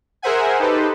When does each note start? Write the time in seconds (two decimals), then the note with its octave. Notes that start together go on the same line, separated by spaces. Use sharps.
0.22 G#4 A#4 C5 E5 F#5 G#5
0.59 D#4 G4 A4 B4 C5